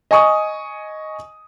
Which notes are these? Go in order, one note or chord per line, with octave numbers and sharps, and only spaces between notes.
D#5 G#5 C#6 D#6